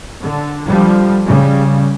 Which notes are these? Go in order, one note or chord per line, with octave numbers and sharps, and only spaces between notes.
D3
D3 F3 G3
C#3 G3